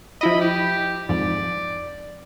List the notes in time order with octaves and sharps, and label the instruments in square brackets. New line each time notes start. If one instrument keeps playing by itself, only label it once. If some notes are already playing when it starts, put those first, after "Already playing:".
[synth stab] F3 E4 D#5 [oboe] B5
[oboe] G4
[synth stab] F2 G#2 [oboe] D5